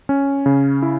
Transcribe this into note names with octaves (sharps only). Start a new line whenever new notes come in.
C#4
C#3
E4